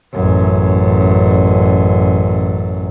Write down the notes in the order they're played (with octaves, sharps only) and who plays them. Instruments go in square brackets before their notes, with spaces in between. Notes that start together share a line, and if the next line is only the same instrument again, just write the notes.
[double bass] A1 F#2